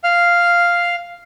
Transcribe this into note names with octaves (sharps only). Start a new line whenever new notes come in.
F5 F6